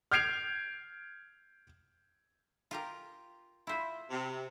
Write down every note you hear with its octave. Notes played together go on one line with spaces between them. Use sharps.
F6 G6 G#6 C7 D7 F7
F4 G4 A#4
E4 F4 C5 E5 B5
C3